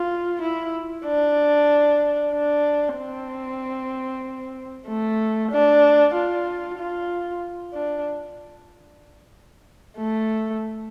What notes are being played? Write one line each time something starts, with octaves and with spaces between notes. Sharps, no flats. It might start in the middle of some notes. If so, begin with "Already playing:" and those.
Already playing: F4
E4
D4
D4
C4
A3
D4
F4
F4
D4
A3